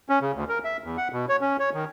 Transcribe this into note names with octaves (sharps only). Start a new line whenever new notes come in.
C#4
C#3
D2
A#4
E5
E2
F#5
B2
C#5
C#4
C#5
D#3